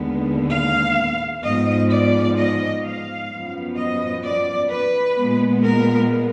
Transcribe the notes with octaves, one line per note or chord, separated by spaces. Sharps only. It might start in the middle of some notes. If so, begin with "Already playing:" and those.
Already playing: D#2 D3 G#3 B3
F5
G#2 F3 B3 D#5
D5
D#5
F5
F#2 F3 B3
D#5
D5
B4
A#2 G#3 B3
A#4